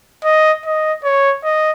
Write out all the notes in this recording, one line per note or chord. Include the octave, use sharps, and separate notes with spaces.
D#5
D#5
C#5
D#5